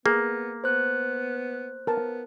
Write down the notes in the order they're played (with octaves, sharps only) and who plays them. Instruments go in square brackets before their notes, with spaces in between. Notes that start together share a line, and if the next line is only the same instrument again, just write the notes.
[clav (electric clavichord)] A#3 [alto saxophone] B3 [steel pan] G#4
[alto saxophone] B3 [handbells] C5 F#6
[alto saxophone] B3 [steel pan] A#4 A5